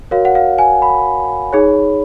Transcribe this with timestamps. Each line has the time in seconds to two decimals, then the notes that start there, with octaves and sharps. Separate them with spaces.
0.11 F#4 A#4 C#5 F5
0.25 F#5
0.35 F5
0.59 G#5
0.82 B5
1.53 D#4 G#4 C#5